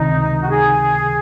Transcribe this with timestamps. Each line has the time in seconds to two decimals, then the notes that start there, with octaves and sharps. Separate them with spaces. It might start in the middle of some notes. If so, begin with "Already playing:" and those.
Already playing: C#2 C3 D#3 D#4
0.41 F#4
0.49 G#4